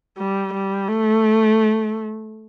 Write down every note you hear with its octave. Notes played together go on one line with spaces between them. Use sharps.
G3
G3
A3